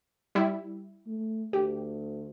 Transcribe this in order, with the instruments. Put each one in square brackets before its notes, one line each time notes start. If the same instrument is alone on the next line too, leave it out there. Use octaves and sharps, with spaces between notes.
[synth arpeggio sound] G3 E4
[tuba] A3
[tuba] D2 [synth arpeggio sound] G4